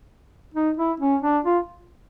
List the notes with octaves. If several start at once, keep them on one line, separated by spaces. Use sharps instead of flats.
D#4
E4
C#4
D4
F4